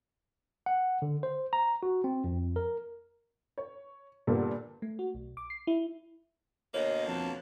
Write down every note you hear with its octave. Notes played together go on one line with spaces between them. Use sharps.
F#5
D3
C5
A#5
F#4
C4
F2
A#4
C#5
A#2 D3 G3 A#3 B3 A4
A3
F#4
B1
D6
C7
E4
D2 B2 A#3 C#5 D#5
F2 A5